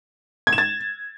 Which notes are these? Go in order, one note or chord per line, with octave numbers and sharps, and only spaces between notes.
G#6
E7
A6